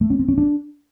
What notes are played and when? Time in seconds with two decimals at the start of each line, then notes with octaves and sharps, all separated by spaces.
0.01 A3
0.10 C#4
0.19 C4
0.28 C#4
0.38 D4